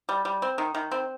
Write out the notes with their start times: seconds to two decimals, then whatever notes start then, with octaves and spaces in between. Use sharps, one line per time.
0.09 G3
0.25 G3
0.42 C4
0.58 D#3
0.75 D#3
0.91 C4